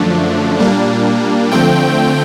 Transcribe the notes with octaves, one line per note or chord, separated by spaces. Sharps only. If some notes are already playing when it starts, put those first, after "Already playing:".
Already playing: F#2 D3 F3 A3 D4
A#2 G3 A#3 D4
D3 F3 A3 C4 G5